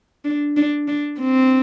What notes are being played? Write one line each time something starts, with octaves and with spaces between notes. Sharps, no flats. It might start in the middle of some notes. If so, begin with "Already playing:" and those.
D4
D4
D4
C4